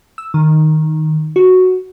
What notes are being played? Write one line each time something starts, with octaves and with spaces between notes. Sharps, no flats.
E6
D#3
F#4